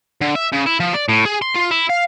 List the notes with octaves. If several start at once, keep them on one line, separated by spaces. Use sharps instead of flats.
D3
E5
C#3
E4
F3
D5
A2
G#4
C6
F4
E4
F5